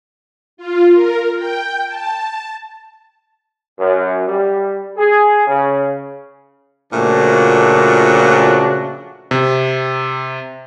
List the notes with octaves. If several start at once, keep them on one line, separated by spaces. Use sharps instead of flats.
F4
A#4
G5
A5
F#2
G3
G#4
C#3
A#2 C#3 F3 A3 D4 F#4
C3